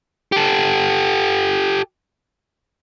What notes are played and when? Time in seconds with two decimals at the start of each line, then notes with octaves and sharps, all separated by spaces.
0.32 G4 A4